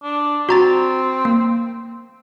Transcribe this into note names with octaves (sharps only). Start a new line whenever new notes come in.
D4
C4 F#4 A#5 A6
A#3